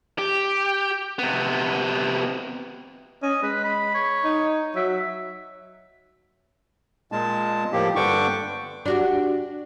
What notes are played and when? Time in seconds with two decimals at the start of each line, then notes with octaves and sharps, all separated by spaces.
0.18 G4
1.19 C3 B3
3.23 C#4 D#5
3.43 G#3 B4
3.64 B5
3.94 C#5
4.24 D#4
4.76 F#3 E5
7.12 A#2 G#3 A5
7.72 A2 F3 A#3 G4
7.96 G2 D3 D4 G5 C#6 D6
8.86 D4 F#4 G4